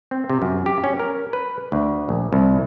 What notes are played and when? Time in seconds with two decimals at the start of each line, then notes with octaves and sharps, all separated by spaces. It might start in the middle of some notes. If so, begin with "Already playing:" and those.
0.11 C4
0.30 C3
0.42 F#2
0.66 G4
0.84 C#4
0.99 A#4
1.33 B4
1.72 D2
2.09 A#1
2.33 C2